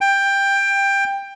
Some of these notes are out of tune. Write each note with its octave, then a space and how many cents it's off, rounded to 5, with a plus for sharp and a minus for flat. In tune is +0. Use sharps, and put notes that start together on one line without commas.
G5 +15